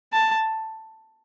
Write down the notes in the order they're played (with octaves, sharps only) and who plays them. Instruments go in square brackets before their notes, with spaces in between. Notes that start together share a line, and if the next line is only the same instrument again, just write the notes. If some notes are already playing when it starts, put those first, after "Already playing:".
[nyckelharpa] A5